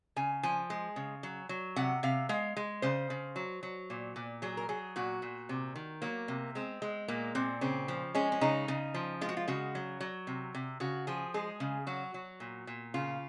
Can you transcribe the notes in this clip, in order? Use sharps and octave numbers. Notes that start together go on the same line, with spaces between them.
C#3 G#5
F3 G#5
G#3
C#3
F#3
F#3
C3 F#5
C3 F5
G#3 F5
G#3
C#3 C5
C#3
F#3
F#3
A#2
A#2
F#3 G#4
A#4
F#3 G#4
A#2 F#4
A#2
C3
D#3
F#3 A#3
C3
G#3 C4
G#3
A#2 A#3
A#2 C4
C#3 C4
F3
G#3 C#4
C#4
C#3 D#4
C#3
F3
G#3 F4
F#4
F4
C#3 F#4
F#3
F#3
C3
C3
C#3 F#4
F3 G#4
G#3 G#4
C#3
F#3 F#4
F#3
A#2
A#2
C#3 F4